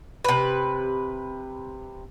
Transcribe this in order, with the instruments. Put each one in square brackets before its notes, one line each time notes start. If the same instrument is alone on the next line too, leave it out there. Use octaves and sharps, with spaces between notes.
[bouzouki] C3 B4